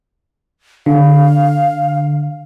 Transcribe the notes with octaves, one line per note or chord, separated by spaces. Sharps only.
D3 F5